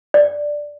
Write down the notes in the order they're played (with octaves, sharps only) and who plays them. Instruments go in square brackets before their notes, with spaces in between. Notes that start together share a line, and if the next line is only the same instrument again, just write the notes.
[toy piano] D5